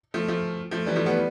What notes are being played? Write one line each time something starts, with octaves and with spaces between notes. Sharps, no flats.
F3 A3
F3 A3
F3 A3
E3 G3
F3 A3
G3 B3